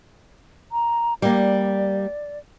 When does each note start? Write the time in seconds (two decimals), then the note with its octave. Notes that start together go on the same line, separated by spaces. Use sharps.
0.72 A#5
1.22 G3 A#3 D5